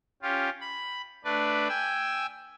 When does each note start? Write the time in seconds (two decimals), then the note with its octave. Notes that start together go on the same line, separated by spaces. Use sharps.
0.22 C#4 F4 G4
0.61 B5
1.24 A3 D4 B4 D5
1.69 G5 G#5 E6